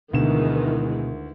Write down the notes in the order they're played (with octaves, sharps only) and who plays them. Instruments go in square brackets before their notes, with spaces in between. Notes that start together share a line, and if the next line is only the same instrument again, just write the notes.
[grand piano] D2 E7 [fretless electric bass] B2 [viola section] D#3 E3 G#3